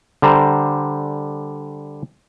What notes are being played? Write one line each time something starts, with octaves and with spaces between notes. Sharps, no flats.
D3 G3 C5 A#5